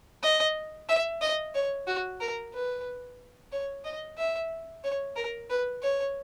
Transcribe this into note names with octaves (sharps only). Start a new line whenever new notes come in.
D#5
E5
D#5
C#5
F#4
A#4
B4
C#5
D#5
E5
C#5
A#4
B4
C#5